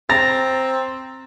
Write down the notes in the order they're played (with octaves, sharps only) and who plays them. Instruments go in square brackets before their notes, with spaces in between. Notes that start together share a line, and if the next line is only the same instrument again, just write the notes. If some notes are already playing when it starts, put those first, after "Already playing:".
[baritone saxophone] C4 [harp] A#5 [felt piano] A6